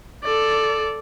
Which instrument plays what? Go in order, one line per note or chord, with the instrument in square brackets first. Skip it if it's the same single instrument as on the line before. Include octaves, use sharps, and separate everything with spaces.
[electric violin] A4 D5